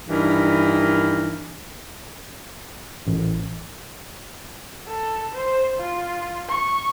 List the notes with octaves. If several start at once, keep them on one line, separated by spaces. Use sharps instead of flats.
G2 D#3 E3
A1
A4
C5
F4
C#6